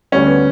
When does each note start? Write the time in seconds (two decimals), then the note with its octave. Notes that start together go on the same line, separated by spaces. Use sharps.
0.12 D2 D3 G3 C#4
0.27 B3